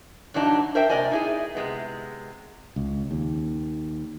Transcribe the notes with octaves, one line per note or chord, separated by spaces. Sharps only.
G2 E3 F#3 D4 D#4
A#4 C5 E5 G5
C3 A#3 A#4 D5 D#5 G#5
D#4 E4 G#4
C3 G#3 B3
C#2
D#2